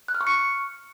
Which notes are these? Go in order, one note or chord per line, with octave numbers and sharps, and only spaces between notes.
F#6
F6
C#6
C#7